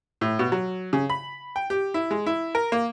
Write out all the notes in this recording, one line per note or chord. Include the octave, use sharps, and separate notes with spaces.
A2
B2
F#3
C#3
B5
G5
G4
E4
G#3
E4
A#4
A#3